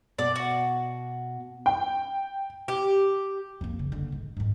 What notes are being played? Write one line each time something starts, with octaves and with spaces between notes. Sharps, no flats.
B2 D5
F#4
G5
G4
F2 A#3
C#3 E3
D3 A#3
G#2
G#2 D#3